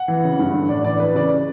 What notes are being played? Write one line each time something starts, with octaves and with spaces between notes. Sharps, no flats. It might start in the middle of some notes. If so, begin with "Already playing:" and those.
Already playing: F#5
E3
C#3
G2
D3
A2 D5
E3 D5
E3 B4
C#3 D5